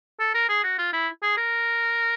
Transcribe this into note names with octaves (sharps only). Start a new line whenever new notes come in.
A4
A#4
G#4
F#4
F4
E4
G#4
A#4